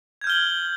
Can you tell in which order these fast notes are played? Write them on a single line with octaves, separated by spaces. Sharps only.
G#6 G6 F6 G7 F#7